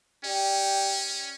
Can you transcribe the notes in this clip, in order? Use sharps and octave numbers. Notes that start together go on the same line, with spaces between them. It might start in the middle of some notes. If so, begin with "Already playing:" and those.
C#4 G4 D5 G5